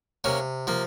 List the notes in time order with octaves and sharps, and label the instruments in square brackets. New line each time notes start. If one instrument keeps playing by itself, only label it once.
[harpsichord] C3 A#3 C#4
F3 A#3